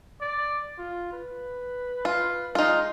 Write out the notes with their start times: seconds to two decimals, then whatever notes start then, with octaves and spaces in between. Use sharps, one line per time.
0.21 D5
0.78 F4
1.12 B4
2.05 F4
2.55 G#3 D#4 F4